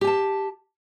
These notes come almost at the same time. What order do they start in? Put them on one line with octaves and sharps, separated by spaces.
G4 G#5 A5